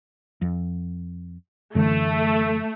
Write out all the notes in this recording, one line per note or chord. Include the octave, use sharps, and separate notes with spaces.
F2
F#2 D3 E3 A3